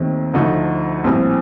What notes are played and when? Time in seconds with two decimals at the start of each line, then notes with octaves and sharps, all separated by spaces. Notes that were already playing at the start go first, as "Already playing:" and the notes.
Already playing: D#2 D#3 A3 C4
0.34 D2 D3 F3 A3 D#4
1.04 A#1 A2 G3 C4